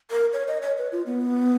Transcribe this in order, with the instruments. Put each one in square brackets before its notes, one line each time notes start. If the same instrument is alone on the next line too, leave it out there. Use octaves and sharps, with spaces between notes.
[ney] A#4
C#5
D#5
C#5
B4
F4
B3